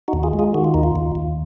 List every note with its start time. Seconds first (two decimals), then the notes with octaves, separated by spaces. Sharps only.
0.08 D#4 F#4
0.13 D#2
0.23 F4 G#4
0.33 G#3
0.39 F4 G#4
0.54 D#3 F#4
0.64 F4
0.74 D#2 D#4
0.83 F4
0.96 D#2
1.15 D#2